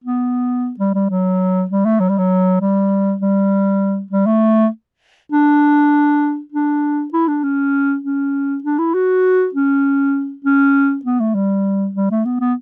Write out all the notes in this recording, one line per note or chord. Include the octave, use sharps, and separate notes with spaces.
B3
G3
G3
F#3
G3
A3
F#3
G3
F#3
G3
G3
G3
A3
D4
D4
E4
D4
C#4
C#4
D4
E4
F#4
C#4
C#4
B3
A3
G3
G3
A3
B3
B3